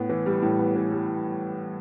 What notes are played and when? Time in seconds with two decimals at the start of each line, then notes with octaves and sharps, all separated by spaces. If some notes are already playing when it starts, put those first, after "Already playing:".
Already playing: A2 B3
0.09 E3
0.26 G3
0.42 A2
0.59 B3
0.76 E3
0.92 G3